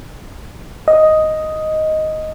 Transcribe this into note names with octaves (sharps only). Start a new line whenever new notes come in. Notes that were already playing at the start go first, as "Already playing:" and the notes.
D#5